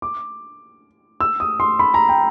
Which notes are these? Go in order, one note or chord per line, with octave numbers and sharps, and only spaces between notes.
D6
E6
D#6
C6
B5
A#5
G5